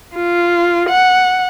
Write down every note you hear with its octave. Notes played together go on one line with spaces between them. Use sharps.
F4
F#5